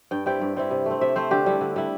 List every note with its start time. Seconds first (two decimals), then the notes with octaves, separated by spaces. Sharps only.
0.11 G2 G5
0.26 G3 C4 E4 G5
0.41 G2
0.56 G3 C4 E4
0.71 C3
0.86 A3 C4
1.01 C3 E5
1.16 A3 C4 C5
1.31 D3 G4
1.46 G3 E4
1.61 D3
1.76 G3 E4